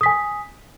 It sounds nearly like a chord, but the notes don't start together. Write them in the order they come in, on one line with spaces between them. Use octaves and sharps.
D#6 B6 G#5